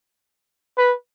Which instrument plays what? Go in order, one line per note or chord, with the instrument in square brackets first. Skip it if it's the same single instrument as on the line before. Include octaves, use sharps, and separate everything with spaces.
[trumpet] B4